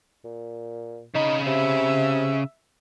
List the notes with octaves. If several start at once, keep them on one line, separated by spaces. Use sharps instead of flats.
A#2
C#3 D#4 B5
C3 E5